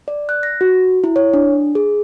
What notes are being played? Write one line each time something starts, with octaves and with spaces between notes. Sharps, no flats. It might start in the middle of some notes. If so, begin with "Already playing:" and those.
D5
F#6
A#6
F#4
E4
C#5
D4
G#4